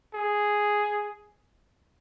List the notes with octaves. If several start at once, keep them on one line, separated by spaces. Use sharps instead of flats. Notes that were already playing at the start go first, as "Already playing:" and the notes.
G#4